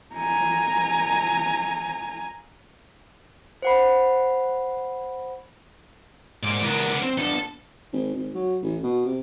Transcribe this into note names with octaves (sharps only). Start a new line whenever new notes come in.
G#5 A#5
C5 F#5 B5
G#2 A#3 D5
C#2 B3 D4 A#4
C4
B3 D4 A4
G#1
G#1
F#3
A1
B2
C3